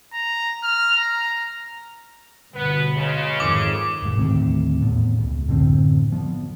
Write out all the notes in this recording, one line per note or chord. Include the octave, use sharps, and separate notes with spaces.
A#5
F6
A#5
G1 B2 B3 B4
C#3 G#3
F2 G#2 D#3 D6
E1 G#2
G1 D#2 A2 C4
E2 A2 B3
C#2
F#2 A2 D3 C4
F3 B3